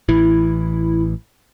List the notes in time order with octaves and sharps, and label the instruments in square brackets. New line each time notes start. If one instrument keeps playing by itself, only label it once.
[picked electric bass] A1 E3 [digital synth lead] E4